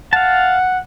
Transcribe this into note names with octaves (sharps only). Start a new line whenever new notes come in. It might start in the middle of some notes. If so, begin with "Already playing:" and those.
F5 F#5 A5